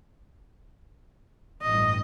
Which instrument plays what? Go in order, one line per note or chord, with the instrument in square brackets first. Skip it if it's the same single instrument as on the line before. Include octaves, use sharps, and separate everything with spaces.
[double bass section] A1 G2 [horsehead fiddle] D#5